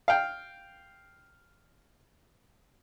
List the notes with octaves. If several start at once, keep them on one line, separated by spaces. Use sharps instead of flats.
F5 G5